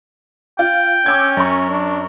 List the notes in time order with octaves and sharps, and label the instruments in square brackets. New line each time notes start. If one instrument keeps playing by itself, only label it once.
[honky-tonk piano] F4 [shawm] G5
[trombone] C#4 [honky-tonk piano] D6 E6 G#6
[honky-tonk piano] F#2 C#6
[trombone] D4